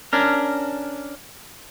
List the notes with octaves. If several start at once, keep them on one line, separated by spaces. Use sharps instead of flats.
C#4 D4 A#4